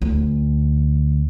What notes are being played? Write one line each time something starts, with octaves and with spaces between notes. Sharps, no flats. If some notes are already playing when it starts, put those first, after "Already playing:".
D2